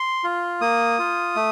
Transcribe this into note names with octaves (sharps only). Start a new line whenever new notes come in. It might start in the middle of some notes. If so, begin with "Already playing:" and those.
Already playing: C6
F4
A#3 D#6
F4
A3